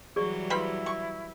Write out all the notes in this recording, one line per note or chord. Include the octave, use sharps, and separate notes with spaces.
E3 F#3 G3 G#4 D5 C#6
E4 B4 C5 F5 B5
C#6